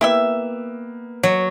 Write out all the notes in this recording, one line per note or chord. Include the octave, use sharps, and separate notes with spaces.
A#3 B3 E4 G4 B4 E5
F#3